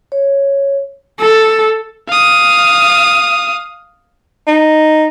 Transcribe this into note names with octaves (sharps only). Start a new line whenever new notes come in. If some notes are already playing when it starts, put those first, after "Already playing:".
C#5
A4
F5 D#6
D#4